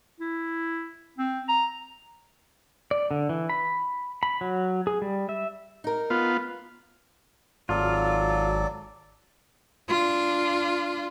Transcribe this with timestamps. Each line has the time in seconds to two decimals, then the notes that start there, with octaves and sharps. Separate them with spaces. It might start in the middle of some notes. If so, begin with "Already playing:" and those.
0.20 E4
1.18 C4
1.48 A#5
2.91 D5
3.11 D3
3.29 E3
3.50 B5
4.23 B5
4.41 F#3
4.87 G#4
5.02 G3
5.29 E5
5.84 D#4 A#4
6.10 B3 F4
7.69 G#1 F#3 F4 A4 D5
9.88 D4 F4